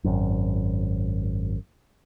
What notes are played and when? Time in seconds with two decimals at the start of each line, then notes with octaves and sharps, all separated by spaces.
0.04 G#1 F#2